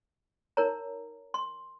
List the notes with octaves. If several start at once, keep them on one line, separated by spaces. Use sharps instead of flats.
D#4 A#4 C#5 A#5
C6